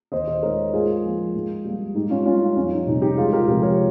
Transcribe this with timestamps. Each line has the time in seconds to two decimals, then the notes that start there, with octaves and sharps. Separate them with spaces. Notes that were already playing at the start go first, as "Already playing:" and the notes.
0.12 D#2 C5 D#5
0.28 C5 D#5
0.43 D#3 G#3 A#4 C#5
0.73 G#2 F4 G#4
1.03 F3 A#3
1.34 G#2
1.65 G3 A#3
1.95 G#2 D#4 G4
2.10 C#4 F4
2.26 G3 A#3 C#4 F4
2.41 D#4
2.56 F2 C#4
2.72 D#4
2.86 C3 G3 D#4
3.02 D#4 G4
3.17 C#2 F4 G#4
3.32 G4 A#4
3.47 C3 F3 G#3 G4 A#4
3.63 A#4 C#5